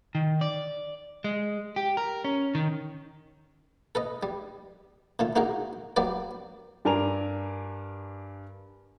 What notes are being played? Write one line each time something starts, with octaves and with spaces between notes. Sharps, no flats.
D#3
D5
G#3
G4
A#4
C#4
D#3
A4 B4 D#5
G3
A#2 A3 F4
A#3 D#4 F#4 G#4 A#4
F#3 A#3 G4 B4 D5
G2 D4 A#4 G#5 A#5 F7